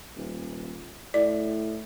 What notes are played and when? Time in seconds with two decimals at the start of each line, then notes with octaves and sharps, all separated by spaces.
0.17 D#1
1.14 A2 D5